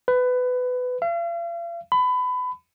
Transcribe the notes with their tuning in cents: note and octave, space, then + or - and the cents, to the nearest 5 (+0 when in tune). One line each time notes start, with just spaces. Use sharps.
B4 +20
F5 -45
B5 +25